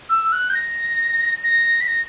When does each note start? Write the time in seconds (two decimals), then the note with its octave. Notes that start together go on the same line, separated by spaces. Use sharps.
0.09 E6
0.32 F#6
0.50 G6
0.54 A#6
1.43 A#6
1.81 B6
1.88 A#6